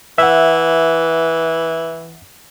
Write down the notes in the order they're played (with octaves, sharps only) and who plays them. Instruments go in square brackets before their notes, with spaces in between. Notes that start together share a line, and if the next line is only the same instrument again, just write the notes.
[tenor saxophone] E3 [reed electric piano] E5 F#5